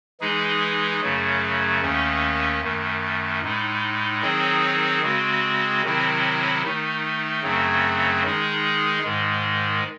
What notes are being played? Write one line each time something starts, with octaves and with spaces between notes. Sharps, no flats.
E3 G#3 D#4 G#4
F#2 C#3 F#3 A3
D#2 D#3 A3 C#4
F#2 D#3 A3
A2 G#3 D#4
D#3 F#3 C4 D#4 G#4
C#3 G#3 C4 F#4
C3 D#3 F#3 C4 E4
D#3 A3 D#4
F#2 C#3 F#3 A3 C4
D#3 G#3 D#4 G#4
G#2 D#3 G#3